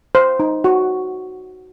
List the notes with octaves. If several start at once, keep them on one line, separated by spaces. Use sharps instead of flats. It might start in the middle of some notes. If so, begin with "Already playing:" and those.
C5
D#4
F#4